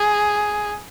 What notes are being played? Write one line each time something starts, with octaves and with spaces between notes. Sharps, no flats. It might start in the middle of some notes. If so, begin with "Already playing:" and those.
Already playing: G#4